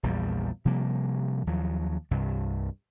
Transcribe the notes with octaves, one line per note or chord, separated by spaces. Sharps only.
A#1 E2 A#2 G3
C3 F3 G3 A#3
D#2 F3 F#3
C2 G2 C3